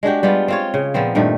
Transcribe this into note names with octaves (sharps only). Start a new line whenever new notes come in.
G#3 D4 F#4 G4
G3 G#3 B3 F4
C4 F4 C#5
C#3
A#2 F3 B3 C4
G2 A#2 D#3 A3